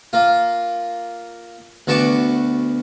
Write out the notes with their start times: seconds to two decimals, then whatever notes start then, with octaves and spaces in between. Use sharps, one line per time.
0.13 A#3 F4
1.87 D2 B3 F#4 A5 C#6 D6